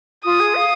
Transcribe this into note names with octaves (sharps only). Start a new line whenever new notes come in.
F4 D#6
G#4
F5